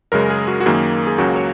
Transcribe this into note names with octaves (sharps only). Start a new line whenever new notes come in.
F#2 C#3 G#3 A#4
G#4
F#4
F#4
F#2 D#3 A#3 G#4
G#4
C#2 C#3 F#3 A#3 F#4
C#5